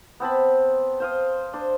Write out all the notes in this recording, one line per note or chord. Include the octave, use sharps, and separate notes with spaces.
B3 C4 A5 B5
C5 F5 D#6
D4 C5